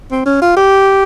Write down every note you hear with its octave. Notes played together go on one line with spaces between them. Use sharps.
C4
C#4
F4
G4